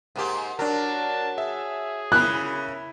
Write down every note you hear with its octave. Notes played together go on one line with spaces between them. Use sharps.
G#2 A#3 G4
F#3 D4 A#4 A5
G#4 E5
C#3 E4 A#4 B5 F#6